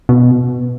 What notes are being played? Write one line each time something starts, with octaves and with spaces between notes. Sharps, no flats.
B2